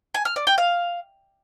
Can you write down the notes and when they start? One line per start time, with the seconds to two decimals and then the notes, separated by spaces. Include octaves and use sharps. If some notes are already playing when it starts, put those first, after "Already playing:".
0.14 G#5
0.25 F6
0.36 D5
0.47 G5
0.58 F5